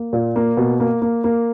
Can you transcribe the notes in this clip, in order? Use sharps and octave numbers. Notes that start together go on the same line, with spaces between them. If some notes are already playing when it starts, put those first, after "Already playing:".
Already playing: A#3
A#2
A#3
B2
A#3
A#3
A#3